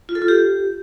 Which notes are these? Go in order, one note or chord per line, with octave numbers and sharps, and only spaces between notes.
F4
A4
F4
G4